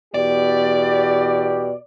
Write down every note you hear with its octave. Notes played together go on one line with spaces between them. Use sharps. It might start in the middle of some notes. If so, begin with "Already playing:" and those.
E2 B2 G4 D5